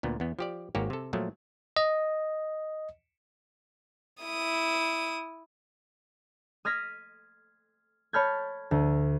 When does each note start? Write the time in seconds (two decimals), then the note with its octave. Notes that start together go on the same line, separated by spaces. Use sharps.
0.03 D2 A#2 B3
0.20 E2 B3
0.39 F3 G4 D5
0.75 G#1 G#2 A#3 F#4 G4 C#5
0.90 C3 A4
1.13 A#2 F3 F#3 A3
1.77 D#5
4.22 E4 D#6
6.65 D#6 F6 G#6 A#6 B6
8.13 C#5 A5 B5 F6 G6 G#6
8.71 D2